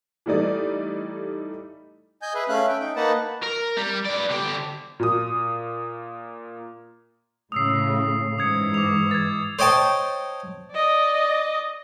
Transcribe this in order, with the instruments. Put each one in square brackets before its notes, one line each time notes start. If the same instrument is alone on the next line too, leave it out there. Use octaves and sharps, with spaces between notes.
[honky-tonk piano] E3 G3 A3 D#4 D5
[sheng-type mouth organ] D#5 G#5 G6
G#4 B4 E5
A3 C#4 E5 F5 F#6
E5 G5
D#4 G5
A#3 D#4 B4 D#5 F#5 A5
[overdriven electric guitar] A#4
G3
B4 D5
D3 G4
[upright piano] A#2 D#6
[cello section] A2 C#3 [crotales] D#6 E6 C7
[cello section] G#2 E3 [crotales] D#6 G#6 C#7
[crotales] D6 F7
G#6 A6
[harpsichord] C5 C#5 D#5 G5 A5
[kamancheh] D5 D#5